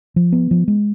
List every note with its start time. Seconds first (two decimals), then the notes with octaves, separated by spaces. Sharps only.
0.16 F3
0.32 B3
0.51 F3
0.68 G#3